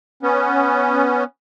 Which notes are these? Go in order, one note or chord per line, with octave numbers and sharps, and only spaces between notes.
B3 C#4